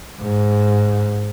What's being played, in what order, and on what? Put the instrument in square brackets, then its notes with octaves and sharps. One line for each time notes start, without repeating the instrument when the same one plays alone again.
[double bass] G#2